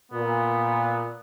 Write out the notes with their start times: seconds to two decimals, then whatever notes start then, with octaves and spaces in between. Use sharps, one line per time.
0.12 A#2 B3